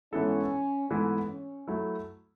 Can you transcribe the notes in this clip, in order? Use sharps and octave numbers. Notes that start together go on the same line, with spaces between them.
G#2 E3 B3 C#4 E4 A4
G#2 E3 A3 B3 E4 A4
C#4
F#3 A3 E4